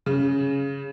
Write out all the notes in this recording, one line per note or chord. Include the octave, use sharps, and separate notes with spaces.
C#3